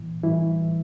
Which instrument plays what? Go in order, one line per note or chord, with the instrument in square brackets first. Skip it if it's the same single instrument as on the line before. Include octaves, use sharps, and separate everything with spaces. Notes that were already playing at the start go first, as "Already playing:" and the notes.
Already playing: [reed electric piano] A#2 E3
A2 E3 G3 E4